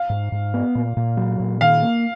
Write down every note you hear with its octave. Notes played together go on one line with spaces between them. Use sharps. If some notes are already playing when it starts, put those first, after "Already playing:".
Already playing: F5
G#2
G#2
B3
A#2
A#2
F#3
A#2
D#3 F5
A#3